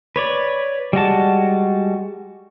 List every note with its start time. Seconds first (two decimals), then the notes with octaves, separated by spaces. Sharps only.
0.16 B4 C#5 D5
0.93 G3 G#3 F#4 A5